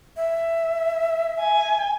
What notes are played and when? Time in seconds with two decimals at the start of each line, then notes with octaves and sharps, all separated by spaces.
0.17 E5
1.40 G#5